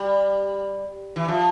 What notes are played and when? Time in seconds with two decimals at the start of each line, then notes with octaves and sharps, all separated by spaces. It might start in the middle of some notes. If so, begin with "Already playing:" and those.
Already playing: G3
1.16 E3
1.28 F3